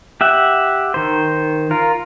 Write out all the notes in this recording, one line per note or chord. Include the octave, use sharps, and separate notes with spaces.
G4 E5 F#5
D#3 C5
F4 A#4